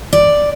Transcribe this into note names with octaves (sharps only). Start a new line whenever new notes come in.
D5